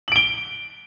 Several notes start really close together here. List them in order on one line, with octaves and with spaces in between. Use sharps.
F#7 D7 G7